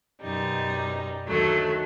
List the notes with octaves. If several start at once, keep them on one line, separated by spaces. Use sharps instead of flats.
F#2 B2 G3 D#4
D2 D#3 F#3 A3 A4